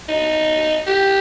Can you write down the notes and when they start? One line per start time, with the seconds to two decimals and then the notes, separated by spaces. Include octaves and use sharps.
0.08 D#4
0.87 G4